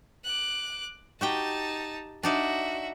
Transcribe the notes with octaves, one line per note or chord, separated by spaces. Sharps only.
D6 F#6
D#4 F#4 G4 G5 A5
D4 D#4 F#4 D5 E5